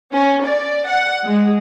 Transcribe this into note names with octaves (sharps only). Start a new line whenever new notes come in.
C#4
D5
F#5
G#3